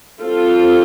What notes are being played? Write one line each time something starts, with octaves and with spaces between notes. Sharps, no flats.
G3 C4 F4 A4